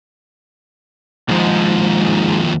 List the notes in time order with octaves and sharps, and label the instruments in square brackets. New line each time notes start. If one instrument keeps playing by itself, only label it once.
[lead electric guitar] D#2 F3 [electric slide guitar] G#2 G#3